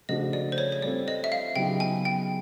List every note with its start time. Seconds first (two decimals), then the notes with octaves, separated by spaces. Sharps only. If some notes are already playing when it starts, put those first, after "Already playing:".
0.09 C#3 F3 A3 D4 F#4 D#5
0.33 D5
0.52 C5
0.58 C#5
0.72 C#5
0.82 G3 C4 F4 A4 C5 D5
1.08 D#5
1.24 E5
1.32 F5
1.56 C#3 F#3 B3 D#4 G4 G5
1.80 G#5
2.05 G5